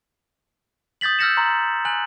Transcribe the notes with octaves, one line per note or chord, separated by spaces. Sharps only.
D#6 G6 A6 B6 F#7
E6 F6 G6 A#6 C#7 E7
A#5 C6
G#5 F#6 F#7